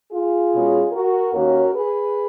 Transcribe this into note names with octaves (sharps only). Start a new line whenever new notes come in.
F4 G#4
B2 G#3 C#4
F#4 A#4
D#2 D#3 A#3 C#4 F#4 A#4
G#4 B4